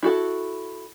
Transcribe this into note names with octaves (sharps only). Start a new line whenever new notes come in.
E4 F#4 A4